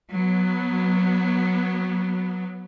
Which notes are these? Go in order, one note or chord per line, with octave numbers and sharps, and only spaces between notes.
F#3 B3